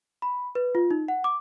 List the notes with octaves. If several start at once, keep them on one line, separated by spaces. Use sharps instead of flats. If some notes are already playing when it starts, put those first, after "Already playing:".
B5
B4
F4
D#4
F#5
D6